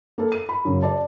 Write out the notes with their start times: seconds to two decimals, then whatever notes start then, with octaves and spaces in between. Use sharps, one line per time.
0.18 A#3 A4
0.32 D#7
0.49 B5
0.65 F#2 C#3
0.83 D5 A5